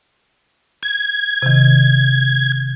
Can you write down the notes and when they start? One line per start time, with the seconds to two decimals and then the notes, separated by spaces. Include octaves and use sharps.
0.83 G#6
1.42 C3 D#3